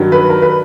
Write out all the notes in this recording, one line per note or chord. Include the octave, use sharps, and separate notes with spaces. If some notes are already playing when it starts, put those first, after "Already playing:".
Already playing: G2 D#3 F#3
B4
A#4
B4